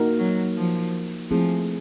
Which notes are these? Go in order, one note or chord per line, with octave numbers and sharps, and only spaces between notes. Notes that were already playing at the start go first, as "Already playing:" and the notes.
Already playing: A#3 D#4 F#4 A#4
F#3
F3
F3 A3 C4 E4 G#4